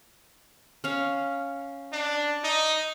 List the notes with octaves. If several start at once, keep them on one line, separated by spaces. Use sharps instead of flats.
C#4 F5
D4
D#4